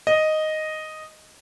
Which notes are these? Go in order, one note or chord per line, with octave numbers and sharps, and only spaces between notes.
D#5